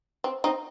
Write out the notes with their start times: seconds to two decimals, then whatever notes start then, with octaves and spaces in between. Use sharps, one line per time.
0.24 C4
0.44 C4 D#4